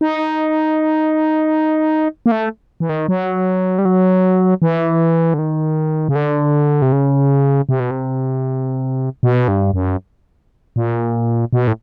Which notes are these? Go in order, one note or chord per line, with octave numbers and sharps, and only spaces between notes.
D#4
A#3
A3
E3
D#3
F#3
G3
F#3
E3
D3
D#3
C#3
D3
C3
C#3
C3
B2
C3
B2
G2
F#2
A#2
B2
A2